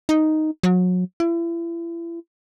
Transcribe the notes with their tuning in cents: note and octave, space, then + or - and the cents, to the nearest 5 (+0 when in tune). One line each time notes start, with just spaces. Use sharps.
D#4 +0
F#3 -30
E4 +35